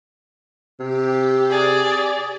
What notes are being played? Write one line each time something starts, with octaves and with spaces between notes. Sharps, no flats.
C3 G4
G#4 D5